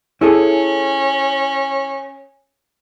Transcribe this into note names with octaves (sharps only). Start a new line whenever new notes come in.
C#4 E4 G#4 A4